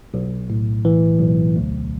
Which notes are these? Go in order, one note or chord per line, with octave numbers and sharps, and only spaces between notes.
B1
A2
E3
B1
D2